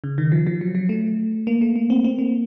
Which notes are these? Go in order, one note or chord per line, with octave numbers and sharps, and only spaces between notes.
C#3
D#3
F3
F3
F#3
F#3
A3
A#3
A3
A#3
C4
C4
A#3